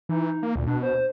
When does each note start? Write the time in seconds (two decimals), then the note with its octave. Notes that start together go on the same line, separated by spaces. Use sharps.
0.09 E3 D#4
0.43 A#3
0.56 D2 A#2
0.67 B2 D4
0.83 C5